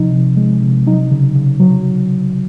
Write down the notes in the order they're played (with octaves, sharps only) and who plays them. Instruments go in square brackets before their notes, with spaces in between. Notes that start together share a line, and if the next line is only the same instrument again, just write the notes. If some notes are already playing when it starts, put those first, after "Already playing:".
Already playing: [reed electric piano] C3 F3 D#4
C3
G#3
C3
F#3 D#4
C#3
C#3
F#3